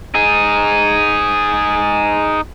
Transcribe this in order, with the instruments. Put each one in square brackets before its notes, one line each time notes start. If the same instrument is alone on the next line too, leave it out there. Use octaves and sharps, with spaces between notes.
[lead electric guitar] D#4 G#4